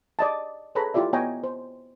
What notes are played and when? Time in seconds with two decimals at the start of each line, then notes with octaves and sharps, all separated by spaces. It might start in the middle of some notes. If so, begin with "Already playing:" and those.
0.19 D5 D#5 A5
0.75 G#4 A4 B4 C#5 A#5 B5
0.94 E4 F4 G4 D5 E5
1.13 B3 C#5 D#5 G5 G#5 A#5
1.44 C5